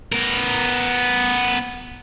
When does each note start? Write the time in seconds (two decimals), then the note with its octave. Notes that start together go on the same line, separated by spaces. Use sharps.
0.12 B3 A#4